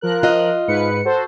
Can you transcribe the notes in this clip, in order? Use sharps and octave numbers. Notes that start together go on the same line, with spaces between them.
F3 A#4 F#6
F4 D#5
G#2 B4 C#7
F#4 A4 C5